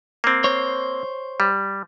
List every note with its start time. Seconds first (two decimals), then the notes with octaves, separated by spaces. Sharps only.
0.24 A#3 C4
0.44 C5 C#5
1.40 G3